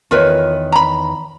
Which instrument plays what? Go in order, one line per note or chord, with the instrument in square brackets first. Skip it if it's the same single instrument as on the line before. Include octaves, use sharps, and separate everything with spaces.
[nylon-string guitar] E2 D#3 C#5 [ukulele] F4 A#4 B4
[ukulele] A#5 B5